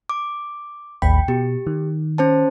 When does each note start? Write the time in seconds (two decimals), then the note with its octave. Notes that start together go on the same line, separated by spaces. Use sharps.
0.09 D6
1.02 A1 D#2 G5 B5
1.28 B2 G4
1.67 D#3
2.18 C#4 C5 A5